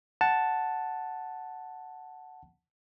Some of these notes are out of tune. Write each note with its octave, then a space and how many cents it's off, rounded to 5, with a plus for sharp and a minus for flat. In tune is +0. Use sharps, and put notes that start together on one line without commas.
F#5 +0 A5 +0